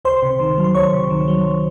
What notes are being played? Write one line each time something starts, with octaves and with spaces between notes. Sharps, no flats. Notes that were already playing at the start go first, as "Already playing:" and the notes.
C#2 C5 C6
C3
D#3
F#3
C6
C#2 C#5 C#6
C3
D#3
F#3